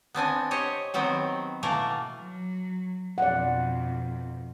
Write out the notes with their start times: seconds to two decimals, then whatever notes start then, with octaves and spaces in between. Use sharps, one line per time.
0.15 B3 C4 D4 G#5
0.51 G4 C5 C#5 D#5
0.94 D#3 F#3 B3 C4
1.63 B2 E3 A3 A#3 A#4
2.21 F#3
3.18 F2 B2 D5 F#5